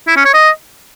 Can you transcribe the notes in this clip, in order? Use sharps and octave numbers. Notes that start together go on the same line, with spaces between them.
E4
C#4
C#5
D#5